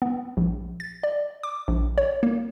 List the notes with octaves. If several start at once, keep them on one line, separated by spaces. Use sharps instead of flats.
B3
A#1
A6
D5
D6
A#1
C#5
A#3